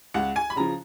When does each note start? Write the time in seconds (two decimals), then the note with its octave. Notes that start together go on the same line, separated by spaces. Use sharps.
0.14 C#2 F#5
0.36 G#5
0.50 B5
0.56 C#3 F3 A#5